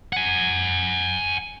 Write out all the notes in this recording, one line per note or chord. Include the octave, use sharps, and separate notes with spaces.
F#5 G#5